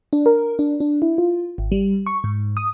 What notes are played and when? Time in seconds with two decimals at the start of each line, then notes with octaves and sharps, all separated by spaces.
0.13 D4
0.26 A#4
0.59 D4
0.80 D4
1.02 E4
1.18 F4
1.58 G#1
1.72 G3
2.06 C#6
2.24 G#2
2.57 D#6